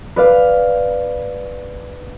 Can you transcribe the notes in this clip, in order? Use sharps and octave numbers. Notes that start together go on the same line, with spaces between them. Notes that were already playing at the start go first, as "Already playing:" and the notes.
B4 D5 F5